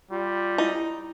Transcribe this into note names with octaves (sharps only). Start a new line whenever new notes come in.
G3 F4
D#4 E4